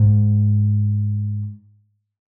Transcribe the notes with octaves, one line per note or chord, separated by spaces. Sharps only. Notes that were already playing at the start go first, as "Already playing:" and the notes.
Already playing: G#2